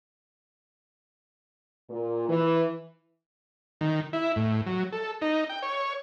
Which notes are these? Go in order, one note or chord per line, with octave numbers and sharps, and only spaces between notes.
A#2
E3
D#3
E4
A2
F#3
A4
D#4
G5
C#5